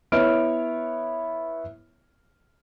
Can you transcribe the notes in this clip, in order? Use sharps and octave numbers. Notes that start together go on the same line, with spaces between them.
B3 E4 C#5 F6 D7